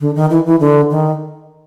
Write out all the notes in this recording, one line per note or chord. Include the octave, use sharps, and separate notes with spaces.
D3
D#3
E3
E3
D3
D#3